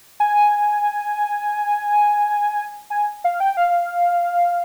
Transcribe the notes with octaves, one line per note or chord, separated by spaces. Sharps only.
G#5
G#5
F5
G5
F5